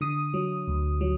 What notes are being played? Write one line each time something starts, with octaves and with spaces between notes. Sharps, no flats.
D3 D#6
F#3
D2
F#3